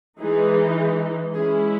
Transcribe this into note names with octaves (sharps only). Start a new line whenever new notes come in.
E3 G#3 D#4 G#4
G#3 C#4 E4 G#4